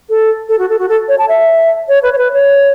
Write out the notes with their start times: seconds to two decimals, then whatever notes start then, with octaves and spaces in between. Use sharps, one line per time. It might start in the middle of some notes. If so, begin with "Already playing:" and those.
0.09 A4
0.49 A4
0.59 F#4
0.70 A4
0.79 F#4
0.89 A4
1.09 C#5
1.19 A5
1.29 E5
1.89 C#5
2.03 B4
2.12 C#5
2.18 B4
2.33 C#5